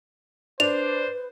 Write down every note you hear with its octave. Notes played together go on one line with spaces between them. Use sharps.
D4 B4 C5 F7